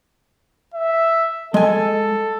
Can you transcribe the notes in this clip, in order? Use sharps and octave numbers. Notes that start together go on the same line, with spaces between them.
E5
G#3 A4 G#5